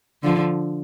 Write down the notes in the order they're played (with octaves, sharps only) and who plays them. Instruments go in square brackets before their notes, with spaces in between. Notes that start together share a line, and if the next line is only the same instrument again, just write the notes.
[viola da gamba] D3 F3